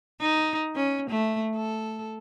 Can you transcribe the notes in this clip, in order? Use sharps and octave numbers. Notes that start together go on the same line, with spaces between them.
D#4
C#4
A3
A4